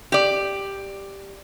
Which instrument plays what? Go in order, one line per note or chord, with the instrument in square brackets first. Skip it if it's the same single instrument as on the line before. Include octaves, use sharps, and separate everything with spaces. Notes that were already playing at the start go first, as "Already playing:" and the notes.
[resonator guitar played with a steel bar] G4 D5